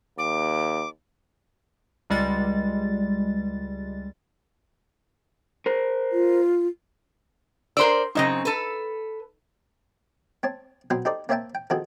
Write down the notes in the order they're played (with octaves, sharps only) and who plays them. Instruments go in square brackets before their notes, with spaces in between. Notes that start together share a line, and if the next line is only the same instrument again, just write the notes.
[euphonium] D#2 [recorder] D6
[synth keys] C#2 G3 G#3 A6
[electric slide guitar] A#4 C5
[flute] F4
[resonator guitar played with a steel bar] A#4 C5 D5 [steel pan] C6 E6
[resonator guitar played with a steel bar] F#2 C#3 C4 [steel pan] D#4 D#5
[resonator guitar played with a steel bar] A4 B4
[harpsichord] C4 C#5 A5
B2 F#3 B3 C4 C5 G#5
D#4 G4 A4 C5 D5
A#3 C4 C#5 E5 G5 A5
G5
D#3 F3 C4 F#4 G#4 A4